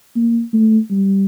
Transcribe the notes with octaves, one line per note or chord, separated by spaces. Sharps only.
A#3
A3
G3